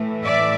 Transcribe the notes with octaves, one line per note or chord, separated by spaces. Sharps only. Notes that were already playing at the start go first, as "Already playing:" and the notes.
Already playing: A2 E3 A3
D5 E5